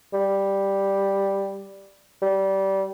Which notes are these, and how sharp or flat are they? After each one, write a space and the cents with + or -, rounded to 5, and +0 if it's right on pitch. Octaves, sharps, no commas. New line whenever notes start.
G3 +0
G3 -20